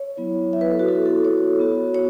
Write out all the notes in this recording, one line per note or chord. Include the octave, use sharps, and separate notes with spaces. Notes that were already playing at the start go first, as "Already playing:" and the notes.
Already playing: C#5
F#3 B3 E4
E5
B4
A4
F#4
B3 E4 A4
A4
C#5
B3 F#4
C#5